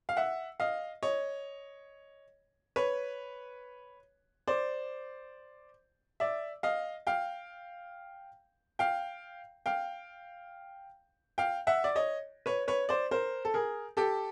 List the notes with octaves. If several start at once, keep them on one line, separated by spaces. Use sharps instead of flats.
F5
E5 F#5
D#5 F5
C#5 D#5
B4 C#5
C5 D5
D5 E5
D#5 F5
F5 G5
F5 G5
F5 G5
F5 G5
E5 F#5
D5
C#5 D#5
B4 C#5
B4 C#5
C5 D5
A#4 C5
A4
G#4 A#4
G4 A4